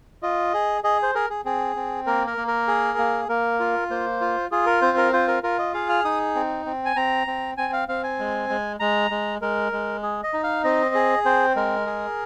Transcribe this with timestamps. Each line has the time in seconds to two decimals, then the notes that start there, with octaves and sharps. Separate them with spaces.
0.22 F4 D#5
0.54 G#4
0.84 G#4 D#5
1.03 C5
1.15 G#4 A#4
1.30 G#4
1.45 C4 G#4
1.76 C4
2.06 A#3 A#4
2.27 A#4
2.37 A#3
2.48 A#4
2.67 G#4
2.98 A#3
3.29 A#3 A#4
3.60 F4
3.90 A#3 C5
4.21 F4
4.51 F4 G#4
4.66 A#4
4.82 C4 C5
4.97 A#4
5.13 F4 C5
5.28 A#4
5.43 F4 A#4
5.59 D#5
5.74 G#4 F5
5.89 F6
6.05 D#4 D#6
6.35 C4
6.66 C4
6.85 G#5
6.96 C4 A#5
7.27 C4
7.58 C4 G#5
7.73 F5
7.88 C4 F5
8.04 G#5
8.19 G#3
8.49 G#3
8.80 G#3 A#5
9.11 G#3
9.42 G#3 A#4
9.72 G#3
10.03 G#4
10.23 D#5
10.33 D#4
10.44 F5
10.64 C4 D#5
10.95 G#4
11.25 C4 C5
11.56 G#3 A#4
11.86 G#4